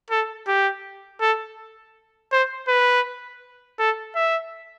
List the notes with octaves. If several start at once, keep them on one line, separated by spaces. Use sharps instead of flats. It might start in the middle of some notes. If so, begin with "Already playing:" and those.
A4
G4
A4
C5
B4
A4
E5